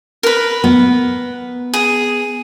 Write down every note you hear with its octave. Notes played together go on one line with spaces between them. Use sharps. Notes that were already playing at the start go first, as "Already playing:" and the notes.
A#4 B4
B3
G#4